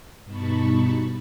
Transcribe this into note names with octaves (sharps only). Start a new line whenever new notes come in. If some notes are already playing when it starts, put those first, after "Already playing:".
G2 B2 D#4 A5 B5 C#6